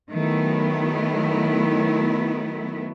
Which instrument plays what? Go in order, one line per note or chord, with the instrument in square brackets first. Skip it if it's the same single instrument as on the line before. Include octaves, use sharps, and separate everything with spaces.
[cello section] D#3 F#3 A3 B3 E4